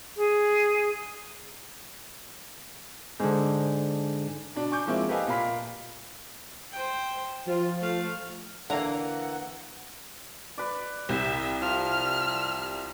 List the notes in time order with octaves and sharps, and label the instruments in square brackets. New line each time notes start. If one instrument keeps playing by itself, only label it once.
[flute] G#4
[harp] G#2 D3
[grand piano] B2 D4
G#5 C#6 D6 G6
F3 G#3 A#3 C4 E4 F4
G4 A4 B4 D#5 F5 G#5
A#2 A#3 F5 B5 B6
[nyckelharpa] C5 G5
[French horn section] F3 [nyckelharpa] F4
[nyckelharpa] A3 F5
[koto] D3 A#5 [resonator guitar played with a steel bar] E3 A#3 [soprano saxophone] F#5
[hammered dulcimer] B4 D5
[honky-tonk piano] C2 G3 G6 [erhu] E5
[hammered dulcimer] F3 [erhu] F6